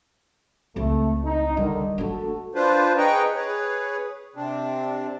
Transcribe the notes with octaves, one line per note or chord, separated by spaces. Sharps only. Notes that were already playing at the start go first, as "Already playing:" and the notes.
C#2 A3 C4
D#4
D3 D#3 G3
A3 D4 F#4 A4
D4 F4 B4 C5
G#4 B4 D#5 G5 A#5 C#6
G#4 B4 C#5
C3 C4 D4